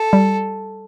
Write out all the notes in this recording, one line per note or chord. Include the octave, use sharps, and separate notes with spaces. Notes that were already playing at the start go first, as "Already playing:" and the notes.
Already playing: A4
G3